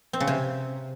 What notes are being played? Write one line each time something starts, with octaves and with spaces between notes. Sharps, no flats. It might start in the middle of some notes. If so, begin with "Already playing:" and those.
C4
C#3
C3